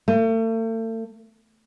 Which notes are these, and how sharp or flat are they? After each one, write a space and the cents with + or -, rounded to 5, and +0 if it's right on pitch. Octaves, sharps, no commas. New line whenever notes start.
A3 +40